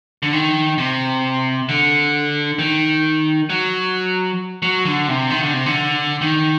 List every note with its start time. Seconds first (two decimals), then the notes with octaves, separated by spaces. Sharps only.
0.23 D3
0.33 D#3
0.78 C3
1.69 D3
2.59 D#3
3.50 F#3
4.62 F#3
4.85 D3
5.08 C3
5.30 D#3
5.43 D3
5.54 C3
5.66 D3
6.21 D#3